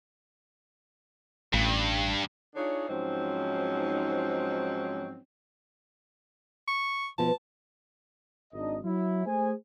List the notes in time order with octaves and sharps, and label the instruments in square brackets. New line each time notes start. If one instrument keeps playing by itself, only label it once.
[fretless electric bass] A1 [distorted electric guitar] G2
[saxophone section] D4 D#4 F4 G#4 C#5
G#2 F3 F#3 C4 C#4 D#4
[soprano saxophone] C#6
[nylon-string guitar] B2 F3 B3 [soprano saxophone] A5
[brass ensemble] G#1 D4 D#4 D#5
F#3 E4
A3 G#4 C5 G#5